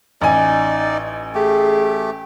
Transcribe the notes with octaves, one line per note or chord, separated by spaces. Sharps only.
A1 D#4 D5 G#5
A3 G4 G#4